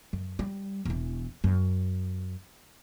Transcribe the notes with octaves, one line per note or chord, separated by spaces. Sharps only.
F#2
G3
E1 E3
F#2